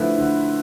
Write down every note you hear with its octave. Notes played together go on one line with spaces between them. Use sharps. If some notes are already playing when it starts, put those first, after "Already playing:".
Already playing: D3 F3 A3 E4 B4
D3